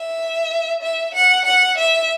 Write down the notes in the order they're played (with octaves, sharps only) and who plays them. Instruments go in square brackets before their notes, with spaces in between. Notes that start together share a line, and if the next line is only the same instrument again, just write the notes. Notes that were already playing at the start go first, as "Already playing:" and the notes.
Already playing: [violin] E5
E5
F#5
F#5
E5